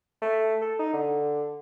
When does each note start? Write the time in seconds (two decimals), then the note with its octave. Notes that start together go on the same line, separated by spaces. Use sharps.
0.22 A3
0.62 A4
0.79 D#4
0.93 D3